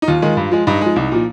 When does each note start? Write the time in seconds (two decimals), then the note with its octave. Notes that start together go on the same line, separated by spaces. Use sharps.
0.02 D#4
0.08 D#2 F4
0.22 D#3 G#3
0.37 G2
0.51 F3 G#3
0.67 G2 D#4
0.81 F3 G#3
0.96 C2
1.12 A#2 F3